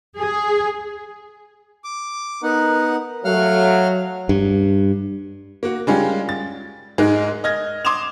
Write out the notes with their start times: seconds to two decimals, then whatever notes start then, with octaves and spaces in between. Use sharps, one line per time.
0.18 G#4
1.84 D6
2.43 B3 D#4 A#4 F#5
3.25 F#3 A3 F5 F#5 F6
4.29 G2
5.63 A#3 F#4
5.87 G3 G#3 C#4 F4 G4
6.29 A6
6.98 G#2 G#3 D#4 A#4 F#6
7.44 D#5 F6 G#6 A#6
7.85 C6 D6 D#6 G#6 E7 F7